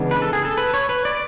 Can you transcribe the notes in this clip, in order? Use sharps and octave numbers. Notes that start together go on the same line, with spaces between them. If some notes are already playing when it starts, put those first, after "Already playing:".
Already playing: C#3 E3 G#3 B3 D4
B4
A4
G#4
A4
B4
C#5
B4
D5